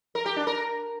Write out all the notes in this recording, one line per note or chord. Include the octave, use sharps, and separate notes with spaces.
A#4
G4
D4
A#4